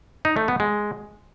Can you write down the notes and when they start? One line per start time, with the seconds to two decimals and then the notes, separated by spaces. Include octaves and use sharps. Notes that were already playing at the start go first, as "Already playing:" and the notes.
0.25 D#4
0.37 A3
0.48 B3
0.60 G#3